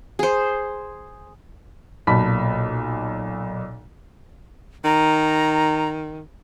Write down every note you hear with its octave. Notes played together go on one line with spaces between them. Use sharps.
G#4 C5
B1 A#2 A5 B5 B6
D#3 A#5